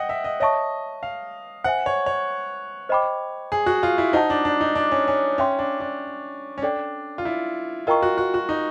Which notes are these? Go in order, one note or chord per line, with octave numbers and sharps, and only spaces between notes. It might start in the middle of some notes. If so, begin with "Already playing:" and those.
Already playing: D#5 F#5 G5
E5
D#5
C#5 D#5 E5 A5 C#6
F5
C5 E5 F#5 G#5
C#5
C#5
C5 D#5 G5 B5 D6
G#4
F#4
F4
E4
D#4 C5 D#5 F#5 A5
D4
D4
D#4
D4
C#4
C#4
C#4 C#5 E5 G5 C6
D4
D4
C#4
D4 A4 D5 G5
F4
E4
F4 A#4 D#5 G5 A#5 C#6
F#4
F#4
F#4
D#4